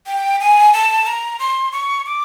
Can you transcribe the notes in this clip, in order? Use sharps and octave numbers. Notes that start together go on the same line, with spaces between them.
G5
G#5
A5
A#5
C6
C#6
D6